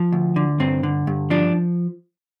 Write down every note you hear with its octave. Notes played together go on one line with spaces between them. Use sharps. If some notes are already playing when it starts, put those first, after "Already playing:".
Already playing: F3
D2
D3
G2 C4
D3
G2
F3 D4